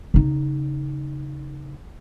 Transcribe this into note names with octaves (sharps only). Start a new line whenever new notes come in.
C#3 D#4